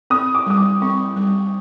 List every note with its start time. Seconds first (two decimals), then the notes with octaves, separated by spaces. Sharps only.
0.10 C4 D#6
0.35 D6
0.47 G3 D#6
0.58 D6
0.82 C4 C#6
1.16 G3